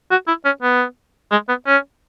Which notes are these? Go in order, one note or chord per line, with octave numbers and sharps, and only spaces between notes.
F#4
E4
C#4
B3
G#3
B3
C#4